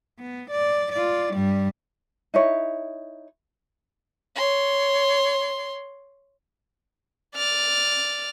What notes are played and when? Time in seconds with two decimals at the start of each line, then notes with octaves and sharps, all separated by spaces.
0.19 B3
0.51 D5
0.93 F4 D5
1.34 G2 G3
2.34 D#4 E4 C#5
4.35 C#5 C6
7.35 D5 F6